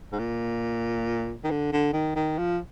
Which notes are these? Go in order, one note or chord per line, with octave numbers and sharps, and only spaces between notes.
G#2
A#2
D#3
D3
D3
D#3
D#3
F3